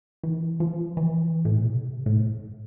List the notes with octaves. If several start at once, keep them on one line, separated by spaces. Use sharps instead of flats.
E3
F3
E3
A2
B2
C3
A2